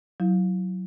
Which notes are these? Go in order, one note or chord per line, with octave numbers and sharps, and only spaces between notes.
F#3 E4